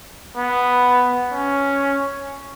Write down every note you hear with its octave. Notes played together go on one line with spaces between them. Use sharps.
B3
C#4